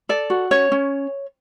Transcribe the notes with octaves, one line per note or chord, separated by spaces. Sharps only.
A4 D5
F#4
C#4 C#5
C#4